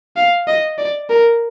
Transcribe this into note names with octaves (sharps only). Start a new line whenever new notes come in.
F5
D#5
D5
A#4